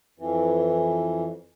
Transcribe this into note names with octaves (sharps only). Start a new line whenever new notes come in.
F2 E3